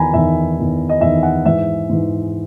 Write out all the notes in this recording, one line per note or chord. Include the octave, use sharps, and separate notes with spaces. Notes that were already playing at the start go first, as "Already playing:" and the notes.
Already playing: E2 D#3 G#5 A#5 B5
E2 D#3 E5
E2 D#3
D#5
E2 D#3 E5
F#5
G#2 E3 E5
G#2 E3